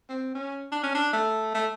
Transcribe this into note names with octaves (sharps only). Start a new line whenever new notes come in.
C4
C#4
D4
C#4
D4
A3
A3